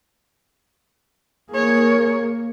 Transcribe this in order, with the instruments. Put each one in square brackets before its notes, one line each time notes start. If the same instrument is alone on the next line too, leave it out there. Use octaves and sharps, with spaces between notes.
[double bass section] A#3 [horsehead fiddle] G#4 C#5